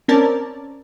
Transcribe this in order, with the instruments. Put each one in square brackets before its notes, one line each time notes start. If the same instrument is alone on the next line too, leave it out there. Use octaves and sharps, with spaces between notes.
[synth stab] C4 C#4 A#4 D5 A5